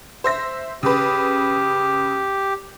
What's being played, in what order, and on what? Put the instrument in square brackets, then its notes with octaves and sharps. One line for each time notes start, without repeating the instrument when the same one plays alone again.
[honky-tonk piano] C5 E5 A#6
[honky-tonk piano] C#3 B4 [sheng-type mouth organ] G4